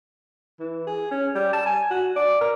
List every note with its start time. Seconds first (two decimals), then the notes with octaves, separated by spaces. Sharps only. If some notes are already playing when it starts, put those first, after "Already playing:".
0.60 E3
0.87 G#4
1.11 C#4
1.35 G3
1.53 A5
1.66 G#5
1.91 F#4
2.16 D5
2.41 A#4